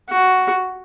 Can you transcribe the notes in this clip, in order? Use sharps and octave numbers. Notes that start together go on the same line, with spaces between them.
F#4